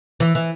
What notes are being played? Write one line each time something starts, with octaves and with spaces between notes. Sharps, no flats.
E3
E3